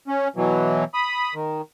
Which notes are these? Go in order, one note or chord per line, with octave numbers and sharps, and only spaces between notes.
C#4
B2 E3 F#3
B5 D#6
D#3